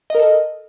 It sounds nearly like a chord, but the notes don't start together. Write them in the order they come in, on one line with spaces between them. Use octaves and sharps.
D#5 A#4 A4